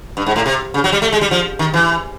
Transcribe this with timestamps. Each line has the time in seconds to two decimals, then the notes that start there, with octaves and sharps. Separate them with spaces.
0.17 G2
0.26 G#2
0.36 A2
0.46 C3
0.74 C#3
0.84 F#3
0.92 G3
1.02 A3
1.12 G#3
1.21 G3
1.31 F3
1.59 D#3
1.74 E3